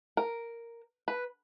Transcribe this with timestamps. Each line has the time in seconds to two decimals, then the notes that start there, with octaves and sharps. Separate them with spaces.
0.17 A#4
1.08 B4